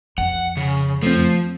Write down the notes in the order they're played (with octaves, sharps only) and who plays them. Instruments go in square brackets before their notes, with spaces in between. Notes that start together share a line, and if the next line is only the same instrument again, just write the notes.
[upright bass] F2 [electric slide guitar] F#5
[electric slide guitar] C#3
[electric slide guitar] F3 [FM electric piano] A3 C4